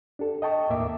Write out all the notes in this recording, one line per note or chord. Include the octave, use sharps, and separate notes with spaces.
D4 G4 A4
D#5 G5 A5 C#6
D#2 A2 A#3 E5 D6